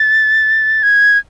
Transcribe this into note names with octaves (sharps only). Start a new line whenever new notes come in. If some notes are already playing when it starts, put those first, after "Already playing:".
Already playing: A6
G#6